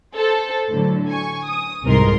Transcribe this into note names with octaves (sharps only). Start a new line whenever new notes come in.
A4 C5
A2 D3 F#3
G#5 C#6
D#6
C2 F2 G#2 A#4 C6